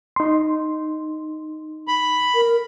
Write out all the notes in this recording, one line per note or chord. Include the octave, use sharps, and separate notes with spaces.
D#4 C6
B5
A#4